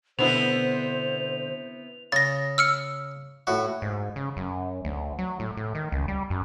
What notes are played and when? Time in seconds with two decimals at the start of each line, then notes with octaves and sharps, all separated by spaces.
0.19 B2 D3 B3 C4 E4 C5 F7
2.12 C#3 A6 A#6
2.58 E6 F6 C#7
3.47 A2 F#4
3.82 G#2
4.16 C#3
4.37 F#2
4.85 D2
5.19 F#3
5.40 A2
5.57 A2
5.75 D#3
5.92 C#2
6.08 G3
6.30 F#2